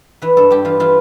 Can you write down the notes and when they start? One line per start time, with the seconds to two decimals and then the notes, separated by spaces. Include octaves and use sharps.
0.22 E3 B4
0.37 G2 A4
0.51 G2 G4
0.65 E3 F4
0.80 E3 F4